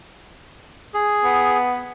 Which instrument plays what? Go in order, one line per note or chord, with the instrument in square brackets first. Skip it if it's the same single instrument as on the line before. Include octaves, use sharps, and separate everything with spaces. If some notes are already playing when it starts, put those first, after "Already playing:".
[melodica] G#4
[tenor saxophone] B3